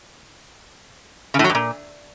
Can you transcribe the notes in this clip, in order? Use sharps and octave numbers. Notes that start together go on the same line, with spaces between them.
C#3
A2
F#3
G2
A#2